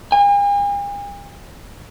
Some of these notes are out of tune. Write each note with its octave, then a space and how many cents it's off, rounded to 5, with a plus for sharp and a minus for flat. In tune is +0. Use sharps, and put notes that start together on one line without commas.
G#5 -45